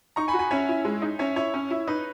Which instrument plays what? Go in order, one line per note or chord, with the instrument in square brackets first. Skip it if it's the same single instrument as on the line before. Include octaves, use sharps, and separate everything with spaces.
[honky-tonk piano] D#4 [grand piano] A#5 C#6
[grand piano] G#5 B5
[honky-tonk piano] F#4
[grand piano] G#5 B5
[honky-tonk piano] C#4 [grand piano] C#5 E5
[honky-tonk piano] E4
G#3
D#4
[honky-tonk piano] C#4 [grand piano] C#5 E5
[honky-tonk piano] E4 [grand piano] C#5
[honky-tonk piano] C#4
E4
[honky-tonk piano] D#4 [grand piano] B4